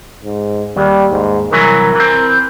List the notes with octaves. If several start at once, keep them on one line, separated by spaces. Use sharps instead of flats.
G#2
D#2 G3
G#2
C2 E3 F#3 A#4
E3 C4